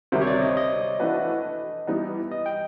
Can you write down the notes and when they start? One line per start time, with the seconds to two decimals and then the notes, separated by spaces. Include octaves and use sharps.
0.12 D2 C3 D#3 G3 C5
0.22 C#5
0.27 D5
0.42 D#5
0.57 D#5
1.00 E3 A3 D4 F#4 B4
1.87 E3 G3 B3 D#4
2.32 D#5
2.46 G5